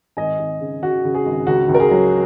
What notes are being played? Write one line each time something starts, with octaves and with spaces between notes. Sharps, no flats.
G#1 D#5 G#5
G#1
C#3
C#3 F#4
C#3
G#4
G#1
C#2 F#4
C#2
A#4
G#4
F#3